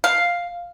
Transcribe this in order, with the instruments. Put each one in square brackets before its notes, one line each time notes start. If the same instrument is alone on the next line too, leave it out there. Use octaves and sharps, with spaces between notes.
[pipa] F5